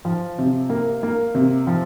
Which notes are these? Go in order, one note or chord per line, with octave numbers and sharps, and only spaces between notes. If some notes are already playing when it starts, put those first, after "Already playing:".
F3
C3
A#3
A#3
C3
F3